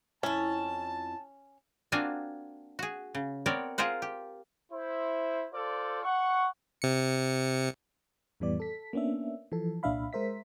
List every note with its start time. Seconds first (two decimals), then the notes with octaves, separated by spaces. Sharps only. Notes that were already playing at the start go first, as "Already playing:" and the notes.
0.23 F2 C#4 E4 A5
1.92 A#3 C4 D4 F4 F#4 G#5
2.79 F#4 G#4
3.15 C#3
3.46 B3 C4 A#4 C#5 D5
3.78 F4 G#4 A#4 C5 F#5
4.02 G4
4.72 E4 C5
5.53 F4 A4 C5 D5
6.03 F#5 C#6
6.82 C3 C#7
8.40 F2 A2 E3 G3 B3 D5
8.60 A4 B6
8.93 A#3 B3 C#4 D4 E5
9.52 E3 F3 A4
9.83 C2 A#2 D4 E5 F5 B5
10.13 G#3 A#4 C5 E5 B6